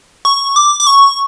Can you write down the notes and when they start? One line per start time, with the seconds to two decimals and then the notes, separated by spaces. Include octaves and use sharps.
0.25 C#6
0.56 D6
0.80 D6
0.87 C#6